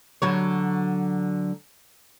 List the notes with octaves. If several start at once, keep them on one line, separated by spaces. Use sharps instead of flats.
D3 F#3 C#5